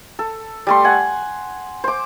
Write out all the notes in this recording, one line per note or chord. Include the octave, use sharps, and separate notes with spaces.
A4
G3 A3 C6
F#5 G#5
C5 D6